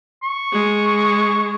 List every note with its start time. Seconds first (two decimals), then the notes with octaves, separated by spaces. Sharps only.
0.23 C#6
0.52 G#3